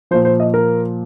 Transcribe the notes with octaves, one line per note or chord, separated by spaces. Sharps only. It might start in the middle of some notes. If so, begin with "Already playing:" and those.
A#2 F3 C5
C5
D#5
A#4